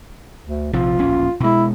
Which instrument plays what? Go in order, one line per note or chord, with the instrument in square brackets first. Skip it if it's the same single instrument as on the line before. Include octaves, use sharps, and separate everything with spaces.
[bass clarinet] D2
[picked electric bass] A#1 C3 F3 [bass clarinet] F4
[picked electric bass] D1 A#1 C#4
[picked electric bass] B2 G#3 [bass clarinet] E4